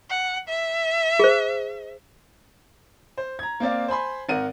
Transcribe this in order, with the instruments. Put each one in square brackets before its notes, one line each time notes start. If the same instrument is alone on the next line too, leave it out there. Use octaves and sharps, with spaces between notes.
[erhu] F#5
E5
[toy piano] G#4 C5
[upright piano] C5
A#5 G#6
A#3 C4 D5 F5
C5 G#5 B5 C6
G#1 A#4 F#5 D#7